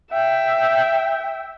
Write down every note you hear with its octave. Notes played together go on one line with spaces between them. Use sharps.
E5 G5